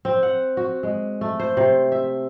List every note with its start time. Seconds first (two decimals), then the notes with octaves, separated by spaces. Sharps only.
0.05 C4
0.23 F#5
0.57 F#4
0.83 G#3
1.21 A3
1.40 C5
1.57 C3
1.92 E5